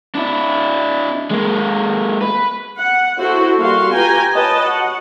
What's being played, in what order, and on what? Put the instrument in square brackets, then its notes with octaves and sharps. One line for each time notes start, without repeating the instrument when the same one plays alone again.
[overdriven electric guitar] D4 E4
G#3 A#3
B4
[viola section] F#5
E4 F#4 A4 C5
G3 A#3 F#4 G4 F5 C6
F4 G4 B4 G5 G#5 A#5
B4 C#5 D#5 G5 A5
F#4 F#5